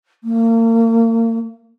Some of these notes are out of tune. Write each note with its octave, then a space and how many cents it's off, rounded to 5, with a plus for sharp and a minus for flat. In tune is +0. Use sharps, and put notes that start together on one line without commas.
A#3 -35